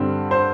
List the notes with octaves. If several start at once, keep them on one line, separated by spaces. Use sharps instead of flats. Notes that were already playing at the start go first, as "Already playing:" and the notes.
Already playing: G2 D3 G3 C4
C5